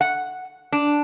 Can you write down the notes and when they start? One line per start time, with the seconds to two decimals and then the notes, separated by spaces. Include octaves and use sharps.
0.01 F#5
0.72 D4